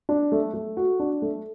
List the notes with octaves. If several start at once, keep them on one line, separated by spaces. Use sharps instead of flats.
D4
A3
A3
F#4
D4
A3